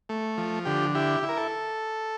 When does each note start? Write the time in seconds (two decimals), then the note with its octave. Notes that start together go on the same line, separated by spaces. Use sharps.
0.09 A3
0.38 F3
0.65 D3 G4
0.95 E4 G4
1.23 E4
1.29 A#4
1.37 A4